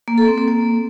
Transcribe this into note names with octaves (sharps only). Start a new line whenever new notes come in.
A#3
A4
C4
A#3
A#3